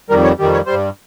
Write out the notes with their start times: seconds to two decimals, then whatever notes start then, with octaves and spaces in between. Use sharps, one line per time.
0.10 F2 D#3 G3 A#4
0.24 C#5
0.39 F2 D#3 G3
0.53 C#5
0.66 G3 C5
0.72 G2